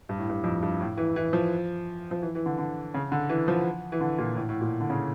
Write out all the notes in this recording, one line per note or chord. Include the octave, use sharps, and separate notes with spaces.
G2
A2
G2
F2
G2
A2
E3
E3
F3
F3
E3
E3
D3
D3
C#3
D3
E3
F3
E3
D3
A#2
A2
A2
A#2
D3
C#3